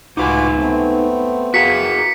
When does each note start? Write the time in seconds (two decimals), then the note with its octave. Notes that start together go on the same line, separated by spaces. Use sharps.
0.17 C#2 A2 D#4 F4 F#4 B4 G#5 D6
0.59 A3 B3 C4
1.54 F#4 G#4 A#4 F5 B6 C#7